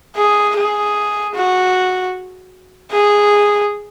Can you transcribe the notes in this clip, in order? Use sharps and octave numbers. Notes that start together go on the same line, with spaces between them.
G#4
G#4
F#4
G#4